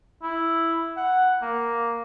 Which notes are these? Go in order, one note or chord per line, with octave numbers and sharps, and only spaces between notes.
E4
F#5
A#3